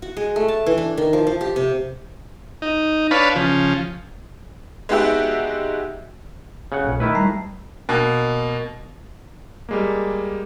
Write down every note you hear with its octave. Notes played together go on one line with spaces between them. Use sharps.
F#4
G#3
A3
A5
E3
D4
D#3
F3
F3
G4
C3
D#4
D4 B4 C#5 F5 A5 B5
C#3 F3
G#3 B3 D#4 F#4 G4 E5
C#3 F#5
B1 A#2
D#3 A3 E4 B4
G3 A5 A#5
B2 A#3
G3 G#3 A#3